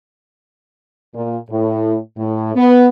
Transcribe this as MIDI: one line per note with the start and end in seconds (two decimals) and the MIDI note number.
1.15 1.37 46
1.50 1.97 45
2.17 2.54 45
2.55 2.87 59